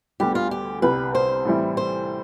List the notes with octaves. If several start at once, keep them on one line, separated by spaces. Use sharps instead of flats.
D2 D3 G3 B3 G4
F4
G4
C2 C3 G3 B4
C5
A2 E3 G3 C4 E4
C5